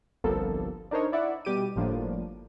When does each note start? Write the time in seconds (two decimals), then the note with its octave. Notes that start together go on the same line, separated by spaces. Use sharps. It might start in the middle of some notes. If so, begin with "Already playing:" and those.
0.24 G1 C2 F3 A#3 B3 A4
0.91 D4 D#4 A#4 C5 C#5 D#5
1.12 E4 D5 E5 F#5
1.45 B2 G3 G4 D6 D#7
1.76 G1 A2 F3 A#3 D4